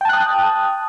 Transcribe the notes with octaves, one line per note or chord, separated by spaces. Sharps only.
G5 A5 D#6 F#6